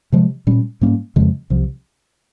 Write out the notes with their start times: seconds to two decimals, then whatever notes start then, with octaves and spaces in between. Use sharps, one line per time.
0.12 C3 F3 G#3
0.47 A#2 G3 C#4
0.81 G#2 G3 A#3 C#4
1.16 F2 C#3 F3 G#3
1.50 C2 C3 F3